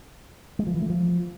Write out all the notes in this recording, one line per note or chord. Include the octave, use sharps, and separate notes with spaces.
G#3
F3
E3
A3
F3